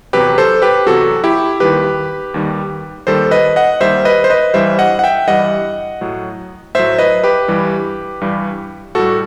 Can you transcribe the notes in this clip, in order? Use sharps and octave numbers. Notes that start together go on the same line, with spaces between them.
E2 C3 F#3 G4 B4
A4 C5
G4 B4
E2 C3 F#3 F#4 A4
E4 G4
D#2 D#3 G3 G4 B4
D#2 D#3 G3
D#2 D#3 G3 A4 C5
B4 D#5
D#5 F#5
D#2 D#3 G3 C5 E5
B4 D#5
C5
B4 D#5
G2 E3 G3 C5 E5
D#5 F#5
F#5
E5 G5
G2 E3 G3 D#5 F#5
A2 F#3
A2 F#3 C5 E5
B4 D#5
G4 B4
G2 E3 G3
G2 E3 G3
A2 G3 F#4 A4